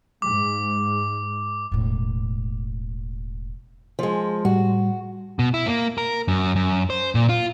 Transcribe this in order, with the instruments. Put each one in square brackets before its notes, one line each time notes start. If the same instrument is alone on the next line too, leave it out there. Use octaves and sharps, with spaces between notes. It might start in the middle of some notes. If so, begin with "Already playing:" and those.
[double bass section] G#2 [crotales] D6
[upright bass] E1 A2
[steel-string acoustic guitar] F3 G#3
[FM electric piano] A2 G3 [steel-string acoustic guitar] F#4
[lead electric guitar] B2
E4
A#3
A#4
F#2
F#2
C5
A#2
F4